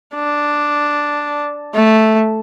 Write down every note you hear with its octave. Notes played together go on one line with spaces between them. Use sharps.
D4
A3